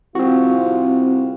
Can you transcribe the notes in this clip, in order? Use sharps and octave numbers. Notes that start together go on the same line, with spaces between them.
C2 C4 F4 F#4